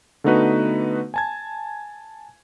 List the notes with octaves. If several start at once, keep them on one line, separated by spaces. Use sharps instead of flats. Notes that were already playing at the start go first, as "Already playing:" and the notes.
D3 A3 B3 D#4 F#4 B4
G#5 A5 G#6